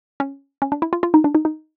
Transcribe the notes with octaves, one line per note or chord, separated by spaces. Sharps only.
C#4
C#4
D4
E4
F4
F4
D#4
D4
D#4
D#4